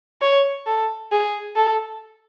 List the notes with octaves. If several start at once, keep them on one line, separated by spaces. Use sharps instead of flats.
C#5
A4
G#4
A4